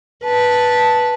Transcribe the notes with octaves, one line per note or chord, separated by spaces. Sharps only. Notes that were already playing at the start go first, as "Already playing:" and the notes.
B4 A5